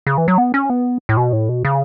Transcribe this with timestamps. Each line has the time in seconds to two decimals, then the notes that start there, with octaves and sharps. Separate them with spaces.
0.07 C#3
0.18 E3
0.28 F#3
0.38 B3
0.54 C#4
0.70 B3
1.09 A2
1.17 B2
1.33 A2
1.49 B2
1.65 C#3